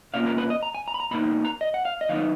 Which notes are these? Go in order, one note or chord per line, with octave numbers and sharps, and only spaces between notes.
B2 A#3 C#4 F4 F5
A#4
B4
D#5
A#5
G#5
A#5
B5
A#5
B2 A#3 D#4 B5
A#5
D#5
F#5
F5
D#5
D#3 F#3 B3 D#4 F5